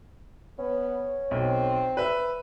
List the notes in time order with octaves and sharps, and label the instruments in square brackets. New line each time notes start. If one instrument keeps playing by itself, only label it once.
[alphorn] B3 [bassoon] C#4
[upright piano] B1 [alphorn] C4
[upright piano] B4 E5